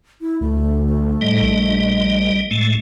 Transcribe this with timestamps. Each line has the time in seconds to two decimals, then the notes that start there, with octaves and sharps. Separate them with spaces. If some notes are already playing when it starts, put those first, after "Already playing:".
0.21 E4
0.41 D2 A3
1.21 A2 G3 D#5
1.42 A#1
2.51 A2 G#3 A3